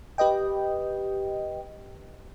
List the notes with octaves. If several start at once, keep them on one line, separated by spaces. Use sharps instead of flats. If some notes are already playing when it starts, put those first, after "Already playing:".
G4 B4 D#5 G5